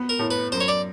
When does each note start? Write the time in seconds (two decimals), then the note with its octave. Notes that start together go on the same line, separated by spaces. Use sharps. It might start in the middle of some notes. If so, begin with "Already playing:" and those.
Already playing: B3
0.09 A#4
0.19 A2
0.31 B4
0.52 F#2 C5
0.61 C#5
0.68 D5